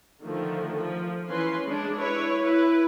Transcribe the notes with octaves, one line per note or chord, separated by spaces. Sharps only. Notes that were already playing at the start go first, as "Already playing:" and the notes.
D3 D#3 F3 A3
F3
E3 C#4 B4 C6
G#3 D4
E4 B4 C#5
E4 B4